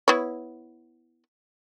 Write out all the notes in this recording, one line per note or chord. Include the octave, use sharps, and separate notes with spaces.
B3 E4 C#5